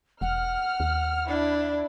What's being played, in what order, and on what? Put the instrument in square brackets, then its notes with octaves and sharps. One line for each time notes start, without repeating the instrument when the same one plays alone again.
[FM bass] E1 [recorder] F#5 [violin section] F6
[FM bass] D#2
[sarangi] D4 [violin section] E4